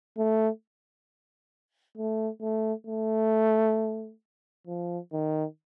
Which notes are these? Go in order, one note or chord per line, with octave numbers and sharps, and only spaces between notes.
A3
A3
A3
A3
F3
D#3